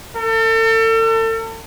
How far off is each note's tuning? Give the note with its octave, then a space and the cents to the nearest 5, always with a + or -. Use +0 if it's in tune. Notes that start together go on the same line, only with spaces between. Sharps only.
A4 +40